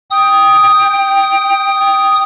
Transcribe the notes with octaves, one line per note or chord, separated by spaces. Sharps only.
G5 D#6